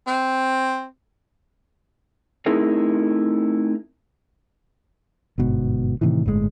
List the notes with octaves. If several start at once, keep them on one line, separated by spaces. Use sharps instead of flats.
C4
A3 C4 D#4 E4 G#4 A#4
G1 G#2 B2
A2 C3 D#3 E3
G1 A2 C3 G#3